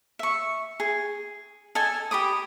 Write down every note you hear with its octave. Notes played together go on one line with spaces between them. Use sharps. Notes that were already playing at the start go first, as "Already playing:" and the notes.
E5 C#6
G#4
A4 D#5 G#5 A5
G4 B5 D6 D#6